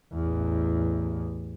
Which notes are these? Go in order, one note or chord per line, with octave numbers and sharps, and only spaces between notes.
A1 E2